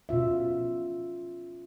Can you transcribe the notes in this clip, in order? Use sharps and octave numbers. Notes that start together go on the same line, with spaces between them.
B2 C#4 F4 E5